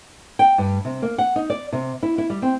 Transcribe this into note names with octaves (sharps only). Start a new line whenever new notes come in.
G5
G2
C3
A#3
F#5
D#4
D5
C3
E4
E4
G3
C4